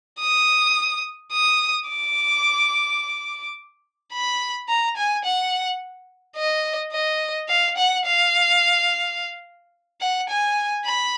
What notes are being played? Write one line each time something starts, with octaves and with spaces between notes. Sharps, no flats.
D#6
D#6
D6
B5
A#5
G#5
F#5
D#5
D#5
F5
F#5
F5
F#5
G#5
B5